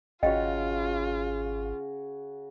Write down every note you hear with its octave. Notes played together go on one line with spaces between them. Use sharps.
G#1 C#3 F4 F#4 C#5 D#5 F5 G5